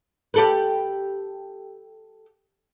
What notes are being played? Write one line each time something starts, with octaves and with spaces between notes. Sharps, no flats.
G4 A4 B4